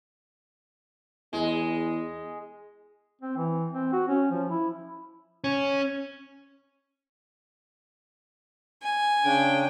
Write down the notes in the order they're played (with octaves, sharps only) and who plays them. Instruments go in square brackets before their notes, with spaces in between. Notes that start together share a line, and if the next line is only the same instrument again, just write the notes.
[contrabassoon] E2 [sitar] G#3
[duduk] C4
E3
C4
F#4
C#4
F3
E4
[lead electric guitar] C#4
[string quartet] G#5
[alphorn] C#3 [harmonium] D4 [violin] G5